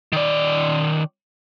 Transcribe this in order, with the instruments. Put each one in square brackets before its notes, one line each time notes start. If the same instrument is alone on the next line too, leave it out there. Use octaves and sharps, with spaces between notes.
[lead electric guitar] D#3 D5